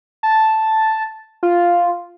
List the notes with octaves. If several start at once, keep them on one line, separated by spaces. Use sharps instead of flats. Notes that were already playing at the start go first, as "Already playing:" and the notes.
A5
F4